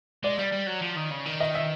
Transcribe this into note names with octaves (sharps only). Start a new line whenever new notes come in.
G#3 D5
G3
G3
F#3
F3
D#3
C#3
D#3
D#5
E5